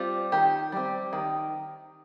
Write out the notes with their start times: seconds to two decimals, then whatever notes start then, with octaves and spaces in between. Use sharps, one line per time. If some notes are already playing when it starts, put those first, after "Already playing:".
Already playing: G3 C4 F4
0.32 D#3 G4
0.72 G3 C4
1.13 D#3